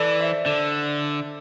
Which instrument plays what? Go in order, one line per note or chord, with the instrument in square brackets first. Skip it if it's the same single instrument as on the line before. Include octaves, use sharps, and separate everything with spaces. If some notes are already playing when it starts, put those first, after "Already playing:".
Already playing: [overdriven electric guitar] E3 [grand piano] A4 D5
[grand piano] C5 E5
[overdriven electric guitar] D3 [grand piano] A4 D5